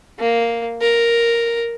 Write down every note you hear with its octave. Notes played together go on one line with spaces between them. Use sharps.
A#3
A#4